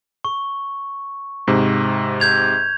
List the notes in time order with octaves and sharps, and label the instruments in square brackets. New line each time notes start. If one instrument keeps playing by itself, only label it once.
[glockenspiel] C#6
[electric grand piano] G#2 C3
[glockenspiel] G6 G#6 F7